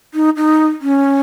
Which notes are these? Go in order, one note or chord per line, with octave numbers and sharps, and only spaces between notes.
D#4
D#4
C#4